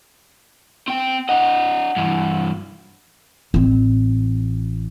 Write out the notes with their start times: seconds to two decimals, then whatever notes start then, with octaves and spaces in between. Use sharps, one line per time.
0.88 C4 G5
1.29 D4 D#5 F#5
1.97 G2 E3
3.54 A1 C4